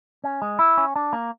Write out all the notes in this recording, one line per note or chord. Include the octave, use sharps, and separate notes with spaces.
C#4
G#3
E4
C#4
D4
A#3